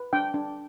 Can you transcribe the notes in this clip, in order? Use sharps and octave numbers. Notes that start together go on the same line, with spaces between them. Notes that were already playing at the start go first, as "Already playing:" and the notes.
Already playing: B4
D4 G5
D4